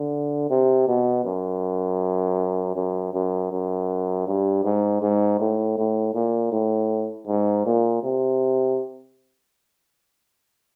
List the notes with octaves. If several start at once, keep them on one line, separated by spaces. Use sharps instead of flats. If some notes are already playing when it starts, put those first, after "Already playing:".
Already playing: D3
C3
B2
F#2
F#2
F#2
F#2
G2
G#2
G#2
A2
A2
A#2
A2
G#2
A#2
C3